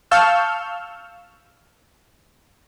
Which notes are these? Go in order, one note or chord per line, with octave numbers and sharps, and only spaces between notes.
F5 A5 C#6 E6 F6 G6